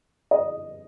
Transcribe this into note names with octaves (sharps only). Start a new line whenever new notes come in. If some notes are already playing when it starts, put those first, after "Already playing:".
D#5